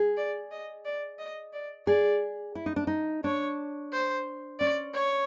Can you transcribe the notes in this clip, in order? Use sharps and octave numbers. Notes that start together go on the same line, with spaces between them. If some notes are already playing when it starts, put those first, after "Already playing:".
Already playing: G#4
D5
D#5
D5
D#5
D5
G#4 D5
E4
D#4
D4
D#4
D4 C#5
C5
C#4 D5
C#5